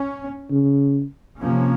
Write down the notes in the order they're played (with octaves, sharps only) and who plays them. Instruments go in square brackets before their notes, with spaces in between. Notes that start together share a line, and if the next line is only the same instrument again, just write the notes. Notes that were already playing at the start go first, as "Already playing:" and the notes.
Already playing: [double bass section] C#4
[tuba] C#3
[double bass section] C3 F3 A#3 C#4